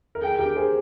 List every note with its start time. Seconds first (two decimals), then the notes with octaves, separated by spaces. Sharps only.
0.15 A#4
0.22 G#4 G5
0.39 G4 A#4
0.56 G#4 C5